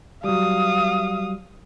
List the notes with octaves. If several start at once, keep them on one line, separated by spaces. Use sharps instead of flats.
F#3 G3 F5 D#6